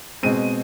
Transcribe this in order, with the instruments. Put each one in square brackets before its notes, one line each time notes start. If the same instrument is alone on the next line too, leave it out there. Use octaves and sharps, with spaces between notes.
[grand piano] B2 G#3 C4 D#7